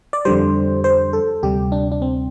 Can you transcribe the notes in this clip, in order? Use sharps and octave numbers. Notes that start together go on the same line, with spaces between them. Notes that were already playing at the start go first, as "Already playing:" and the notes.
D5
F2 D3 G3 C5
C5
A4
D2 C3 G3 G4
D4
D4
C4